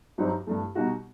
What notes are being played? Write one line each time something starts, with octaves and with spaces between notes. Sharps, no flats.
G2 F#3 C4 D#4 G4
G2 E3 A3
B2 G3 D#4 F#4